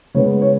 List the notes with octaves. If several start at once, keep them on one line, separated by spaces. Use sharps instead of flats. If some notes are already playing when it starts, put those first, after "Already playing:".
C#3 G#3 B3 C#5
C#5